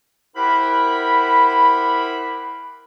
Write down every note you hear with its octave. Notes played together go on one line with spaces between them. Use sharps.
E4 G4 A#4 C5 F#5 B5